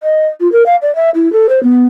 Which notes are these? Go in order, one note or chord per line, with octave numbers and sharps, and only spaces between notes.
D#5
F4
A#4
F5
D5
E5
E4
A4
C5
B3